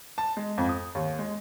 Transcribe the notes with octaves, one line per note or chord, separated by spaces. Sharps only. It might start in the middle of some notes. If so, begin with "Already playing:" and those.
A5
G#3
F2
D#6
D#2
G#3